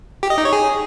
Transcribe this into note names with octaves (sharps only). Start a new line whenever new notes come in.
G4
D#5
D#4
C#5
G#4